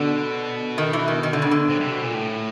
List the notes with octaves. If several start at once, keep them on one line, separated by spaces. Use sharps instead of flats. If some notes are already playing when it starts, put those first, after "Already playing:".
Already playing: B2 D3
D#3
E3
D#3
D#3
D3
C#3
D3
C3
C3
B2
A#2
A2